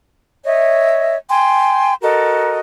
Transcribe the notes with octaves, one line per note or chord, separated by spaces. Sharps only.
C#5 D#5 E5
G5 G#5 C6
F#4 A4 A#4 D#5